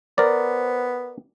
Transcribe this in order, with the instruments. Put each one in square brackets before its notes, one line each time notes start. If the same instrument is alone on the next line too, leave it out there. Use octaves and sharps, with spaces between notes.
[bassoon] B3 [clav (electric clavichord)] A#4 D5 [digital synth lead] C5